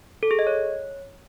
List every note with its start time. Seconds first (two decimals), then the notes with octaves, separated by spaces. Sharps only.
0.23 A4
0.31 G#4
0.39 D#5
0.47 C#5